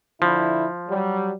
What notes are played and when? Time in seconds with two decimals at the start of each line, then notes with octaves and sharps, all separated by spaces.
0.22 D3 F3 E4
0.89 F#3 G3